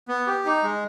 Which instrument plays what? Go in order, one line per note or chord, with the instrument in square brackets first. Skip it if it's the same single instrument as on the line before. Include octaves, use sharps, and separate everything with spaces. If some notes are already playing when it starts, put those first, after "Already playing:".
[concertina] B3
G4
D#4
G#3